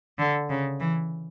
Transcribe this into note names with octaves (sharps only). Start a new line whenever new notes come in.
D3
C#3
E3